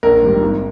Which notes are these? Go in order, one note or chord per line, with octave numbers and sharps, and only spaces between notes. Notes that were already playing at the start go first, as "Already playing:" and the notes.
A#1 A#4
G#2 D#3 G3
G#1